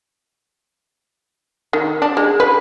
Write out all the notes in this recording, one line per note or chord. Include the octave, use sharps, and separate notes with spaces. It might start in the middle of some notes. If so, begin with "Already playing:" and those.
D#3
D4
G#3
B4